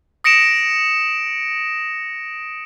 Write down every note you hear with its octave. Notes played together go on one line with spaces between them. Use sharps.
D#6 A#6 C#7 D7 E7